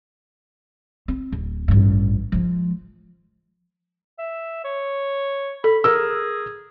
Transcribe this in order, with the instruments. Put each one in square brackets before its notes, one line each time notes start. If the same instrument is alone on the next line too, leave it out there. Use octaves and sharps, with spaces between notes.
[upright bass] C4
D1
A1 G2
F3 G#3
[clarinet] E5
C#5
[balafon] A4 [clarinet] B5
[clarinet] G#4 [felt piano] A#4 E6